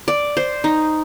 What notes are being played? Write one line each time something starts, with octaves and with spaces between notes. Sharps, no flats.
D5
C5
D#4